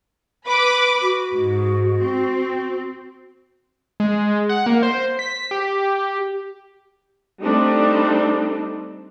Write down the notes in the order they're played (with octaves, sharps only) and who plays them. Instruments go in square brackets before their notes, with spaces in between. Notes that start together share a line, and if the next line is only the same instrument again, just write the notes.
[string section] B4 B5 D6
[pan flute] F#4
[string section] G#2
C4
[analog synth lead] G#3
F#5
A#3
C5
B6
G4
[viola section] G3 A3 C4 D4 D#4 A4